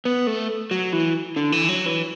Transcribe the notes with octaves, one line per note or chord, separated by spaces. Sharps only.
B3
A3
F#3
E3
D3
E3
F#3
E3